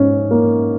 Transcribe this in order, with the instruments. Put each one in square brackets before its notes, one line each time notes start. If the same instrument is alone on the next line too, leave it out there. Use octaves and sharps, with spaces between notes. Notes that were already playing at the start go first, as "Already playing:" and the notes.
Already playing: [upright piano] G#2 C#4
A#3